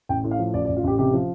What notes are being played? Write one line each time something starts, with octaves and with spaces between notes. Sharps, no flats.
A1 G5
A2
F5
F3
A1 D5
D5
A1
F4
A1 G4
C3 G4
F3